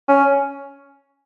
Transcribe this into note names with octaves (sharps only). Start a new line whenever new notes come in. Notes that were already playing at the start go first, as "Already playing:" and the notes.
C#4